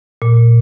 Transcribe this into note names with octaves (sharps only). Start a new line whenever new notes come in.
A#2